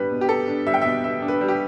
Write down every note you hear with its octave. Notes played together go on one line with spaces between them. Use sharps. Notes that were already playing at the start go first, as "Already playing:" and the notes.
Already playing: G3 B3 D4 B4
B2
G4
B3 A4
D4
G3 E5
G5
B2 E5
B3 E5
D4
B4
G3
G4